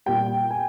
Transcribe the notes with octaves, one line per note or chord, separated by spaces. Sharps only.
A#2 G3 G5
G#5